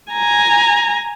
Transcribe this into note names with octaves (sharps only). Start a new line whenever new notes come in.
G#5 A#5